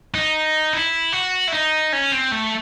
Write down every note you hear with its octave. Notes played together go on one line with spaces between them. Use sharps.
D#4
E4
F#4
E4
D#4
C#4
C4
A3